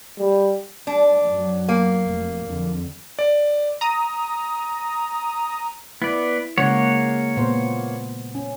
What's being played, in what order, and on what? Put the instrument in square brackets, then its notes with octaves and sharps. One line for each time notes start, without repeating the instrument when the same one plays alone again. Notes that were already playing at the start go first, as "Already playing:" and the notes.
[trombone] G3
[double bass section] G3 [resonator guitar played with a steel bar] D4
[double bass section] F#2 F#3
[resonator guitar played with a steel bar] A#3
[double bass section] F1
F2 D3
[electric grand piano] D5
[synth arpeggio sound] A#5 D#6
[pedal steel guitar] B3 D5 [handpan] E4
[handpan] C#3 G#3 F#5 [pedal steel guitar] A#3 C#5
[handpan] A#2 B3 C5
C#4